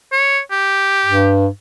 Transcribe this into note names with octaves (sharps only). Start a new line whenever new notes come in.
C#5
G4
G2